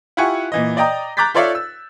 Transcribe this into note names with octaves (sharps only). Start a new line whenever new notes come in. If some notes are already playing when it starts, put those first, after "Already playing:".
E4 F4 G4 F#5 G#5 C#6
A#2 E3 D#5
D5 D#5 G5 A#5 D#6
A#5 D6 F#6 G6 A6 B6
F4 A4 C#5 D5 E5 F5
E6